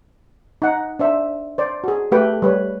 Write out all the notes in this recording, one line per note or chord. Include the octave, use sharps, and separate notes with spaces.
D#4 F#5
D4 C5 E5
C5 D5
F#4 G#4
A3 G4 B4 G5
G3 B4 C#5